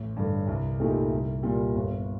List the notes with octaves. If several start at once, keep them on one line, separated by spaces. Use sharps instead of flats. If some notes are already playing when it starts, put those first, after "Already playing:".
Already playing: A1
G2 D3
C2
A#2 A3 D#4 G4
C2
A#2 G3
G1